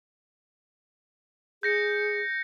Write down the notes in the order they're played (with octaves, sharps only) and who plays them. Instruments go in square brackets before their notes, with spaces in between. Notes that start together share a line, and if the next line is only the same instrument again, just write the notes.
[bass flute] G#4 [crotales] G6 A#6 C#7